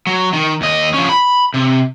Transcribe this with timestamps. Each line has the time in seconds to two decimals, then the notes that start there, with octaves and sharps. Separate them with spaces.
0.07 F#3
0.33 D#3
0.61 D#2 D#5
0.94 F3 C#4
1.09 B5
1.54 C3